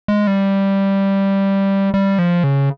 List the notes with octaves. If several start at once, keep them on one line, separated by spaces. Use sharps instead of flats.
G#3
G3
G3
F3
C#3